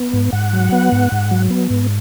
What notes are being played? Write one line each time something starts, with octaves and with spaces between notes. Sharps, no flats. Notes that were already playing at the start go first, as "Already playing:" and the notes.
Already playing: B3
G#2
G#2 F#5
F#3
B3
G#2
G#2
F#3
B3
G#2